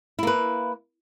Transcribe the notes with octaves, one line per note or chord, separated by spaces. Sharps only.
A#3 E4 B4